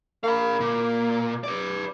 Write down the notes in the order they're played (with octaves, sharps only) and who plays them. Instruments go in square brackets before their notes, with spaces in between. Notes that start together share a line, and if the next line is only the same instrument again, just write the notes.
[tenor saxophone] A#3 [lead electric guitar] F5 B5
[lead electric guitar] A#2
B4 D5